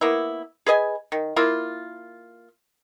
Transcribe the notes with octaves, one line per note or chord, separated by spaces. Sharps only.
A#3 B3 E4
G#4 B4 D#5 G#5
D#3
A#3 E4 F4